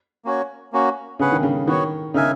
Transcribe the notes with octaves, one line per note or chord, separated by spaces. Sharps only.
A#3 C#4 F#4 C#5
A#3 C#4 F#4
C#3 C#4 G#4 B4 F#5
D#3
C#3
D#3 B3 F#4 C#5
C#3 D#4 A#4 E5 G#5